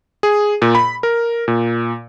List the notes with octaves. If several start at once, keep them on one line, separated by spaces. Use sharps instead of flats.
G#4
A#2
B5
A#4
A#2